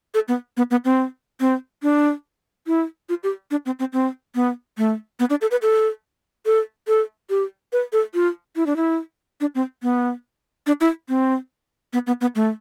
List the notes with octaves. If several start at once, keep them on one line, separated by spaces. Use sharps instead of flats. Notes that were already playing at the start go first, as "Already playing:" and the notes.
A4
B3
B3
B3
C4
C4
D4
E4
F4
G4
D4
C4
C4
C4
B3
A3
B3
D4
A4
B4
A4
A4
A4
G4
B4
A4
F4
E4
D4
E4
D4
C4
B3
D4
E4
C4
B3
B3
B3
A3